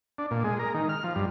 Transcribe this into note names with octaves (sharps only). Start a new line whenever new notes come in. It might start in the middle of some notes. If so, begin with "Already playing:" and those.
D4
A#2
G#3
A#4
D#3
F6
F3
G2